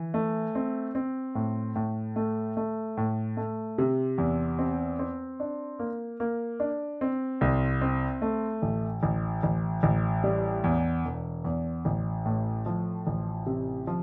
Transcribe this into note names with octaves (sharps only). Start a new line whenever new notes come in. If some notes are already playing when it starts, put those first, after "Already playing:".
Already playing: E3
A3
C4
C4
A2
A2
A3
A3
A2
A3
C3
E2
C4
C4
D4
A#3
A#3
D4
C4
C2
C4
A3
A1
A1
A1
A1
G3
E2
E1
E2
A1
A2
F3
A1
C3
F3